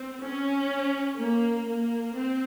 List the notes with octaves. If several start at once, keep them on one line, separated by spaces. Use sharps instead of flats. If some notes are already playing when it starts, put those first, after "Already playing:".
Already playing: C4
C#4
A#3
A#3
C4